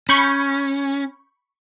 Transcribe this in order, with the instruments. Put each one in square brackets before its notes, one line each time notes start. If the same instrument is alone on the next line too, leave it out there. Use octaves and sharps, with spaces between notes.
[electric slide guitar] C#4 [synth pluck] B5 C#6 G6